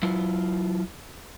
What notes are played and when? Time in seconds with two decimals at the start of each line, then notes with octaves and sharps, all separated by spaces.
0.03 F#3 E4 F4